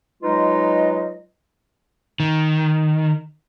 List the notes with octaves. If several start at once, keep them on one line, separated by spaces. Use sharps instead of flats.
F#3 G#3 D#4 F4 B4 D#5
D#3